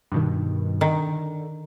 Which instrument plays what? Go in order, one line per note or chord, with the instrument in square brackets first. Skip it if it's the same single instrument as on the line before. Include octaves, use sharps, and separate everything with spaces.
[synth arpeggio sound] G2 B2 D#3
[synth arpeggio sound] D3 [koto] D#3